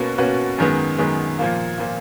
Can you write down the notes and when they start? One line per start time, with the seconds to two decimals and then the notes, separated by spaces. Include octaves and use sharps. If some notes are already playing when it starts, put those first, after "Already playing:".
Already playing: B2 A#3 C#4 F#4 B4
0.18 B2 A#3 C#4 F#4 B4
0.58 F#2 D#3 G#3 B3
0.98 F#2 D#3 G#3 B3
1.39 A#2 F3 A#3 F4
1.78 A#2 F3 A#3 F4